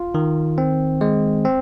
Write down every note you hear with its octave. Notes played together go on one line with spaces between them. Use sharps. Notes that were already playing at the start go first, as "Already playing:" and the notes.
Already playing: F4
D#3
C4
G#3
C4